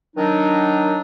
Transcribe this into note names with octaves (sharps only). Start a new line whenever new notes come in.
D#3 F#3 D4 D#4